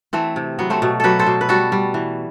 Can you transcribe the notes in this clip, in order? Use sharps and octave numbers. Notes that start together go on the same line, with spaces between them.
E3 A3 C4
C3
F#3 B3
A3 C4
B2
F#3 G4 A4 B4
A4 C5
B2
B4
G3 F#4 A4
G3
E3